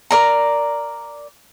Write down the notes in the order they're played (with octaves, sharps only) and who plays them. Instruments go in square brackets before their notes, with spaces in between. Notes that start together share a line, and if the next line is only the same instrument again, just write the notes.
[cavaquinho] A#4 D5 A#5